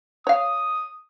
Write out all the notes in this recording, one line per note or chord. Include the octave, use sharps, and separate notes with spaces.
C#5 F5 D#6